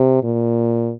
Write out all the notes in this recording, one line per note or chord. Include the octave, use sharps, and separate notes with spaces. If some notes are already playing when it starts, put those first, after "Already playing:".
Already playing: C3
A#2